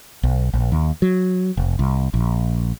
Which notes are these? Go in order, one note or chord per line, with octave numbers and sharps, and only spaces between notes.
B1
A#1
D#2
F#3
F1
C2
A#1